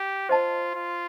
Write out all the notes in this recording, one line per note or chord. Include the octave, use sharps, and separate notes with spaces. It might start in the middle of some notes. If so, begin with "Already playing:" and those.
Already playing: G4
F4 C5 D#5 A5
F4